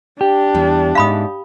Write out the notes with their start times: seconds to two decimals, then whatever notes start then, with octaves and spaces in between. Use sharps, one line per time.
0.21 D4 G4
0.55 E2 G3
0.95 G#2 E5 F5 B5 D#6